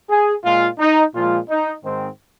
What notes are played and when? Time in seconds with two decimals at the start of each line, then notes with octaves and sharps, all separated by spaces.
0.10 G#4
0.44 A#2 G#3 F4
0.80 D#4
1.14 A#2 F3 G#3 F4
1.49 D#4
1.84 G#2 D#3 G#3 C4